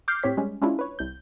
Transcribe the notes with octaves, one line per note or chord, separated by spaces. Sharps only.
D6 F6 G6 C7
A2 C4 G4 C#5 B6
G3 G#3 C#4
G#3 C#4 D4 E4 F4
B4 C#5
C2 G6